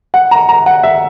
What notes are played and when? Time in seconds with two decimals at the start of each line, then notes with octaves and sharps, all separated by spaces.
0.14 F#5
0.31 A#5
0.49 A#5
0.66 F#5
0.83 E5